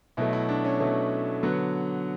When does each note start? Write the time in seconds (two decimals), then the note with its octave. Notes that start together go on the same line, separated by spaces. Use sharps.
0.17 B2 F#3 A3 E4
0.33 E4
0.49 D4
0.65 C#4
0.80 B2 F#3 A3
1.43 D3 F#3 B3